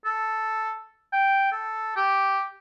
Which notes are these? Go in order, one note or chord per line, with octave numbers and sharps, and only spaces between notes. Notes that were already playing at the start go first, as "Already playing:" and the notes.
A4
G5
A4
G4